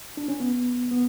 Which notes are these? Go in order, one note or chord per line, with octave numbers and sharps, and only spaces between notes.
D4
C#4
B3
B3